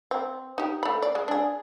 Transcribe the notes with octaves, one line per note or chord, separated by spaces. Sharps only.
C4
D#4 G4
A3 B5
D5
G#3
D4 G#4